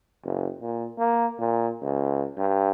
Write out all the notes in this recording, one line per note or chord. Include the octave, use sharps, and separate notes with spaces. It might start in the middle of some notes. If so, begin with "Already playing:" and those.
F#1
A#2
A#3
A#2
C#2
G2